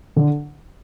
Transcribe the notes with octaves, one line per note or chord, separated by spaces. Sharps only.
D3